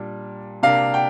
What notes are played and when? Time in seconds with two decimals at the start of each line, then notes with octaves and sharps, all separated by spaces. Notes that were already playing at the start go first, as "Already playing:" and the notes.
Already playing: A#2 G3 D4
0.63 C3 A#3 D4 F5
0.94 G5